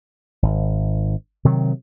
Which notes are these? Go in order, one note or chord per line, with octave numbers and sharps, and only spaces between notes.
G#1
C3 D#3 F#3